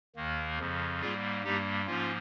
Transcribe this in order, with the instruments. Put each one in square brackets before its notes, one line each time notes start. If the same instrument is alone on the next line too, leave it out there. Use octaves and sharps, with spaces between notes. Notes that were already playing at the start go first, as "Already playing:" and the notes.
[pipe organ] D#2 D#3 A#3
F2 C#3 F3
G#2 G3 A#3 F4 G#4
G2 G3 A#3 D#4 G4
G#2 F3 A#3 C#4 F4